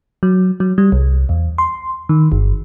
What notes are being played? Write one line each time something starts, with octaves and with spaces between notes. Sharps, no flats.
F#3
F#3
G3
C2
E2
C6
D#3
G1